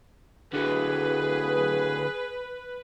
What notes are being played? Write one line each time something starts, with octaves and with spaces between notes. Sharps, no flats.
D3 F#3 G#4 B4